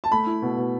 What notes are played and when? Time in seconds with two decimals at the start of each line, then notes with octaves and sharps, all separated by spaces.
0.04 A5
0.11 A3 B5
0.26 E4
0.42 B2
0.57 B2